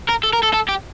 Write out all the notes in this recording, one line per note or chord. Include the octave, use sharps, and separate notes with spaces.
A#4
A4
A#4
A4
A4
G4